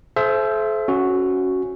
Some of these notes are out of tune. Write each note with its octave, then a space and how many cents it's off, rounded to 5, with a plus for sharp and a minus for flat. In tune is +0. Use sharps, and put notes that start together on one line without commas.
A4 -40 C5 +0 E5 +25
C#4 +0 F#4 +0